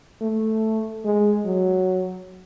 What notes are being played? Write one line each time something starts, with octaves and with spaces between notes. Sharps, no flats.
A3
G#3
F#3